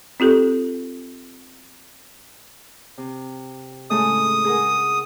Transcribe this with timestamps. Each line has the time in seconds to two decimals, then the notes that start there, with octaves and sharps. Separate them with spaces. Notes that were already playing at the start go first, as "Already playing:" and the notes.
0.20 C4 F4 G4 A4
2.98 C3
3.90 A2 C#3 G#3 D#6
4.45 G#4 A#4 F#5